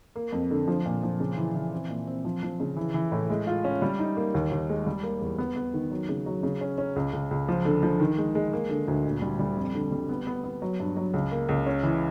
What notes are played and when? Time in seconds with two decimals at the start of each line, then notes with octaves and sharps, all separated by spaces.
0.16 A#3
0.32 F2
0.51 D3
0.67 F3
0.85 A#2
1.03 F3
1.20 C#3
1.37 E3
1.54 E3
1.72 C4
1.89 A#2
2.07 C4
2.25 F3
2.43 F3
2.60 C#3
2.77 E3
2.94 E3
3.12 A2
3.30 G#3
3.47 F4
3.64 C#4
3.82 G3
3.99 D#4
4.17 A#3
4.34 D#2
4.52 D#2
4.69 G#3
4.87 G3
5.03 A#3
5.21 E2
5.38 B3
5.56 B3
5.74 D#3
5.91 F#3
6.09 C#3
6.26 F#3
6.43 C#3
6.61 C#4
6.78 C#4
6.96 C#2
7.13 C#2
7.31 C#2
7.48 F3
7.65 D3
7.83 F3
8.00 D#3
8.18 G#3
8.35 G#3
8.53 A#3
8.70 D3
8.88 D2
9.05 A#2
9.22 G3
9.39 G3
9.57 F2
9.74 D3
9.92 G3
10.09 B3
10.27 B3
10.44 B3
10.62 F#3
10.80 G2
10.97 F#3
11.13 C#2
11.32 A#3
11.49 C#2
11.66 C#4
11.83 E3